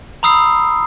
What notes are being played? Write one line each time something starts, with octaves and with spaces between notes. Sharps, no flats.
A#5 B5 D#6 E6 C7